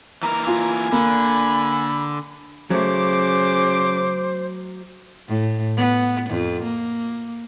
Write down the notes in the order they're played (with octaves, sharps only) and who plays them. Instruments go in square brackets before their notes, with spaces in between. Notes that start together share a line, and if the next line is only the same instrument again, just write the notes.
[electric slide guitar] E3 A#3 A#4 [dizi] A#5
[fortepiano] F4 [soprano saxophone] G#5
[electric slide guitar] D3 [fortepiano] A#3 [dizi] B5
[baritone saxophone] C#3 [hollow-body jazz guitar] F#3 A3 [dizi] C5 [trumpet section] D6
[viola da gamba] A2
B3
F2
A#3